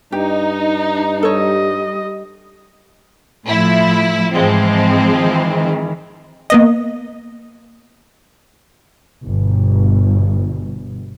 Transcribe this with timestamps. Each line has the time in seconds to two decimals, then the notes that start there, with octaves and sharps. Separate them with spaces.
0.12 G2 D#4 G4
1.23 G3 A4 C#5 D#5
3.48 A2 F3 E4
4.34 G#2 E3 F3 G#3 C4
5.17 D#3 E3
6.50 A#3 B3 D#5
9.25 G1 B2